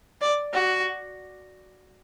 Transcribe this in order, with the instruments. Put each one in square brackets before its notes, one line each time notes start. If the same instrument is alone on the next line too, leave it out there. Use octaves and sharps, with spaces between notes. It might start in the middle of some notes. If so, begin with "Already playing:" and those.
[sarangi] D5
F#4